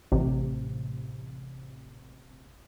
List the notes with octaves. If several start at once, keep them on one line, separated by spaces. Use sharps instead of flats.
A1 C3